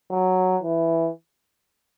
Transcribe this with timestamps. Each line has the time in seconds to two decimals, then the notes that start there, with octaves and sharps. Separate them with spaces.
0.11 F#3
0.62 E3